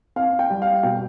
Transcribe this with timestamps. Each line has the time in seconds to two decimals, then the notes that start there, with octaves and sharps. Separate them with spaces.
0.16 C4 F5
0.39 G5
0.50 G3
0.62 F5
0.83 B2 G5